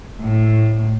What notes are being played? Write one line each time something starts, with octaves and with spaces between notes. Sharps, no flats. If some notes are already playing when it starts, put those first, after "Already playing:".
A2